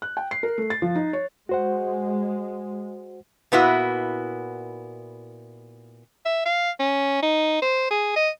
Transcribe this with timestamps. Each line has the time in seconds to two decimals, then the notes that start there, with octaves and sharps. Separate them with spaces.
0.02 F#6
0.17 G5
0.31 C7
0.43 A#4
0.58 A3
0.70 A6
0.82 F3
0.95 D#4
1.13 C#5
1.49 G#3 F#4 C5 F#5
3.52 A#2 B3 E4 F#4
6.26 E5
6.46 F5
6.80 C#4
7.23 D#4
7.62 C5
7.91 G#4
8.16 D#5